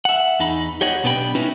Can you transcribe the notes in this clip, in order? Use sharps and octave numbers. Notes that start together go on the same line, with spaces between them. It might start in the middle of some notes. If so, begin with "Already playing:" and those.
E5 F#5
E2 D#4 B5
G4 C#5 D#5 F#5
B1 B2 B3 D4 G5 B5
C#4 D#4 E4 F#4 B4